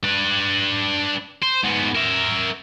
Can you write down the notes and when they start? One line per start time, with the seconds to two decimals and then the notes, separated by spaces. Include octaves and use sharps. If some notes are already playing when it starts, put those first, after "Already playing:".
0.04 D4 B4
1.43 C5
1.64 G#2 B3
1.95 A#4 E5